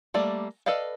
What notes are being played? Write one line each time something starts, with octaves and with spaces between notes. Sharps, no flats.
G3 A3 A#3 D5
A4 B4 D5 D#5 F5